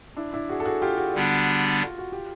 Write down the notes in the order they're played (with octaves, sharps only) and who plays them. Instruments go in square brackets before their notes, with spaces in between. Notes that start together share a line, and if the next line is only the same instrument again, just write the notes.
[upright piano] D4 E4
D4 E4
F#4 G#4
A4
F#4 G#4
F4 G4
F#4 G#4
[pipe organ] D3 G3 B3 D4
[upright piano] F4
F#4
F4 G4